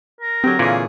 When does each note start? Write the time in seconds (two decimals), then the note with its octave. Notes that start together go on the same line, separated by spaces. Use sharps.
0.21 A#4
0.44 D3 F#3 C4 G4
0.59 A#2 D3 E3 G#4 C#5 F5